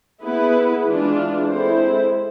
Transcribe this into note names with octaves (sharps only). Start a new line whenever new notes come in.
B3 E4 G#4 B4
E3 G#3 D4 F4
G#3 C4 E4 A4 C5